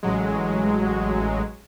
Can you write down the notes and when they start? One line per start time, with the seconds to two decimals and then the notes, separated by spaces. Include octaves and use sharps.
0.03 A1 F#3 G#3